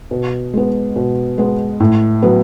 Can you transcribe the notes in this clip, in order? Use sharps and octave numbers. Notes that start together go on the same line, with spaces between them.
B2
G#3 B3
B2
G#3 B3
A2
F#3 B3